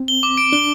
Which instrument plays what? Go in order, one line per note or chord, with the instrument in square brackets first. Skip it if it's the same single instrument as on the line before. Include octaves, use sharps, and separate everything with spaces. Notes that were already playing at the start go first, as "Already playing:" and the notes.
Already playing: [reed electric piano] C4
[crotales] G7
D6
D7
[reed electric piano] D4 [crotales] G7